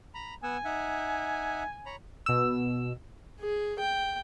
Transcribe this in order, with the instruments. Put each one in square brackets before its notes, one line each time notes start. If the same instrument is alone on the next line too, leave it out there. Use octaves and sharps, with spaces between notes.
[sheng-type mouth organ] A#5 B5
[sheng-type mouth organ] B3 F#5 E6 [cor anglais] G#5
[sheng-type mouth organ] D#4 E5 F#5
C#5 A#5 B5
[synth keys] B2 E6
[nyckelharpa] G#4
G5